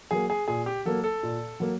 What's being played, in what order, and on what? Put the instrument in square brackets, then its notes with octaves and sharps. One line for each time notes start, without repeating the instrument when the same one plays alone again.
[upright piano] F#3 A#3 [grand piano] G#4
[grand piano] G#4
[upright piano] A#2 [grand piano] G#4
[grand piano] G4
[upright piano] F#3 A#3 [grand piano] A4
[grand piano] A4
[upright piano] A#2
F#3 A#3